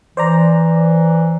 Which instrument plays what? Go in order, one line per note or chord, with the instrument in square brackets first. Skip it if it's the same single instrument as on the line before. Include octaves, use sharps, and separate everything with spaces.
[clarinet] E3 [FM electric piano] C5 D5 A#5